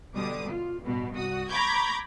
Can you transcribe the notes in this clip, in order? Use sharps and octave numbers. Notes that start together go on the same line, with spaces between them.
B2 D3 G3 D6 D#6
F4
A1 G2 B2
C2 F#4 D#6
A#5 B5 C#6 D6 G6 G#6